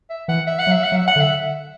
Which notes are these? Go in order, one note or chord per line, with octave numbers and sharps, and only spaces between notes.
E5
E3 F#5
E5
F#5
F#3
E5
F#5
F#3
E5
F#5
D3
E5